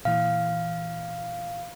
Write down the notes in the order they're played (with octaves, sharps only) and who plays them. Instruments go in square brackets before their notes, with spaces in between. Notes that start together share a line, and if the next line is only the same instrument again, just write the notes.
[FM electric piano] A#2 E3 [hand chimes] F5